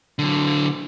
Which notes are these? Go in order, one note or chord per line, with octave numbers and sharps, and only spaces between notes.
D3 F#3